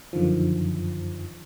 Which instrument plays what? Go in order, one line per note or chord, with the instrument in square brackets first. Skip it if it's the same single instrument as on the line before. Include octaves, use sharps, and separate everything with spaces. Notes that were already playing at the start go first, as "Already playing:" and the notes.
[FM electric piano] F#2 D3 D#3 F3